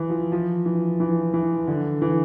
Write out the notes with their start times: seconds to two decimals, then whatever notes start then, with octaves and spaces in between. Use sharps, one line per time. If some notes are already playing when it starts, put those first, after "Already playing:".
Already playing: E3
0.10 F3
0.32 F3
0.66 E3
1.00 E3
1.34 E3
1.67 D3
2.02 E3